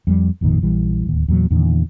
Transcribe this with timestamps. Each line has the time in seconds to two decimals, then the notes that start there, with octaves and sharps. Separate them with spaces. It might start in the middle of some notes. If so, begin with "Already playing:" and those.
0.07 F2 G3
0.41 G#1 F2 A#2 D#3
0.62 A#1 E3 G3
1.06 D1 D#2
1.28 E2 A#2 F#3
1.51 E2 A#2 D3 D#3